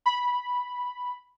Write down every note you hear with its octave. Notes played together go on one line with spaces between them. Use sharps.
B5